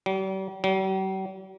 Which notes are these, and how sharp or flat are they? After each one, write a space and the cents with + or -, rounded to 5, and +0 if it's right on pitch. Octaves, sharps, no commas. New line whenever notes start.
G3 -40
G3 -45